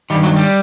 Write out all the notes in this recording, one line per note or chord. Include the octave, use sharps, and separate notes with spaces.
G2 D#3 G3
F#3
G3